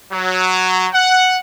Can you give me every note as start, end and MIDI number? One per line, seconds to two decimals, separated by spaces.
0.11 0.88 54
0.93 1.38 78